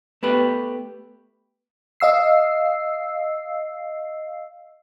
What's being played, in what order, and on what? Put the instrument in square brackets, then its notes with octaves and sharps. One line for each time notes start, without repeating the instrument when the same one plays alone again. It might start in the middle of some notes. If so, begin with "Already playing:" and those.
[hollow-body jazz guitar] A3 B3 G4 B4
[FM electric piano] D#5 F5 E6 C7